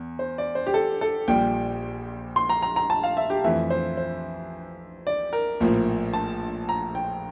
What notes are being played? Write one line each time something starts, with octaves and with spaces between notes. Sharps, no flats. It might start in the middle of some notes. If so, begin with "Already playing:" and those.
Already playing: E2
C5
D5
C5
G4
A4
A4
A#1 A#2 G3 G5
C6
A#5
A#5
A#5
A5
F5
E5
G4
F2 E3 A3 E5
C5
C5
D5
A#4
A#1 A2 F3 A#3
A5
A#5
G5